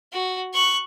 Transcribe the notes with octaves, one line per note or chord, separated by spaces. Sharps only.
F#4
C#6 F#6